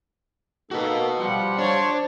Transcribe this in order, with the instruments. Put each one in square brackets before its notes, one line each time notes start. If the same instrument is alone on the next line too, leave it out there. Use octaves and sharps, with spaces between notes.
[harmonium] A#3 D#4 A4 [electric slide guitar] F#4 B4
[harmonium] F3 G3 F4 [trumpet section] G4 F#5
[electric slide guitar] D4 [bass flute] C5 [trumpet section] C#5